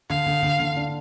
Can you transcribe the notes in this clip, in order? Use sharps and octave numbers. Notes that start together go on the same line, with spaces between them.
D3 F5
D3
D3
D3
D4